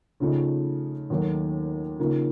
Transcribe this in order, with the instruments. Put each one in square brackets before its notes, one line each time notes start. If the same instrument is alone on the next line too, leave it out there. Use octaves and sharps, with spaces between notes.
[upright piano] C#3 F3 A3 D#4
D#2 D#3 F#3 A3
C#3 F3 A#3 D#4